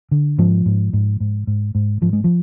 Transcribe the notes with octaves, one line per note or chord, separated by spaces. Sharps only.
D3
G#2 F3
G#2
G#2
G#2
G#2
G#2
G#2 F3
G#3
F3